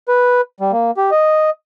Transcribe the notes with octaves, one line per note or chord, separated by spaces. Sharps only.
B4
G3
A#3
G4
D#5